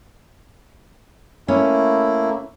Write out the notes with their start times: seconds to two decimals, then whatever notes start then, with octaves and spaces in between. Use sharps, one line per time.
1.48 A3 A#3 C#4 E4